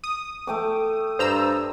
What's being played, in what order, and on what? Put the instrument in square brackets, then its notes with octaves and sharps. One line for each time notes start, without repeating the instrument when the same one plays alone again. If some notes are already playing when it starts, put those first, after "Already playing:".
[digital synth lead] D#6
[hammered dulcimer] A3 G5 D6
[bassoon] G2 [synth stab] C5 A#5 E6